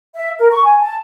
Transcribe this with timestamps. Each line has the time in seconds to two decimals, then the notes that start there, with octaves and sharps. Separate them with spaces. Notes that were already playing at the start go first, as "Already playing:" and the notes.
0.16 E5
0.39 A#4
0.51 C#6
0.65 G#5
0.80 A5